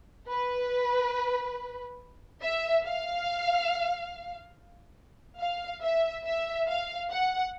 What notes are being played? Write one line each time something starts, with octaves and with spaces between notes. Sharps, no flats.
B4
E5
F5
F5
E5
E5
F5
F#5